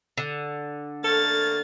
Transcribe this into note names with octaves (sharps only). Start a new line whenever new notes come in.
D3
A3 A#3 A4 F6 A6